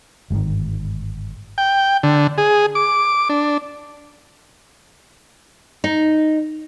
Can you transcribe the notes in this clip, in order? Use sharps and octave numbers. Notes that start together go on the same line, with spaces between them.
G1 G#2 C3 D#3
G5
D3
G#4
D6
D4
D#4